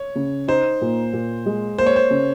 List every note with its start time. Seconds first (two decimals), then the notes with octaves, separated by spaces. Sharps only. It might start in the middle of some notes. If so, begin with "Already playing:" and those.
Already playing: C#5
0.16 C#3
0.48 D#4 C5
0.81 A#2
1.13 A#2
1.46 G#3
1.78 A#3 C5
1.86 C#5
1.96 C5
2.10 C#3